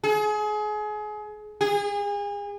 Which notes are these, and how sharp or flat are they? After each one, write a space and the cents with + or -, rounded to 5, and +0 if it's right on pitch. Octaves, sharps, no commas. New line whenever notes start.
G#4 +30
G#4 -35